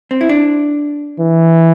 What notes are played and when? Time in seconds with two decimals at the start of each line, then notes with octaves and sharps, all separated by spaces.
0.11 C4
0.21 E4
0.29 D4
1.19 E3